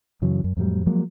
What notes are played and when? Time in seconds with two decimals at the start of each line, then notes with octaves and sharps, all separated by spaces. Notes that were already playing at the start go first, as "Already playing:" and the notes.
0.22 F#2 C#3 E3 F#3
0.44 F#2
0.57 F2 A2 F#3 G3
0.87 F3 F#3 G#3 A#3